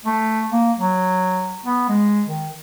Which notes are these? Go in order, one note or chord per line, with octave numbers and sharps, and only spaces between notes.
A3
A#3
F#3
B3
G#3
D#3